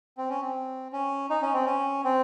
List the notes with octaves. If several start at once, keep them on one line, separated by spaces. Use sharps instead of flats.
C4
C#4
C4
C#4
D#4
C#4
C4
C#4
C4